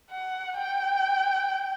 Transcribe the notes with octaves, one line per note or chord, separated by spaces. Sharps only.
F#5
G5